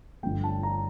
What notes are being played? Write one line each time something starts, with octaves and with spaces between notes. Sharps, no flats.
G1 G2 F3 A3 G5
A5
A#5